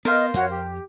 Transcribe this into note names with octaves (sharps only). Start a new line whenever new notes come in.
B3 A#4 C5 D#5 F5
F2 F#4 C#5
G4